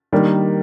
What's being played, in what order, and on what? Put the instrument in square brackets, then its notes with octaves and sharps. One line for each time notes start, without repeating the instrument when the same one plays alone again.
[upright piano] D#3 G3 A#3 D4